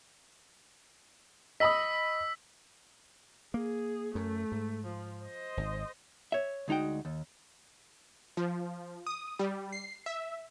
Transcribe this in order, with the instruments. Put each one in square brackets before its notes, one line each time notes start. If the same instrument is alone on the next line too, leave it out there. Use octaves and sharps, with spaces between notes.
[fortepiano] D#5 B5 D#6 [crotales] E6 B6
[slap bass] A#3 [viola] G#4
[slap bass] F#2 [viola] A3
[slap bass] G#2
[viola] F3
C5 D#5
[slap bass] G#1
[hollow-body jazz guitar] C#5 E5
D2 G#3 D#4 F#4 G5
D#2
[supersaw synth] F3
D#6
G3
C7
E5